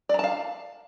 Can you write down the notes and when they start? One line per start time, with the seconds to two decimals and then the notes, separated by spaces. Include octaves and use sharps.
0.09 D5
0.14 A#5
0.19 A5
0.24 F5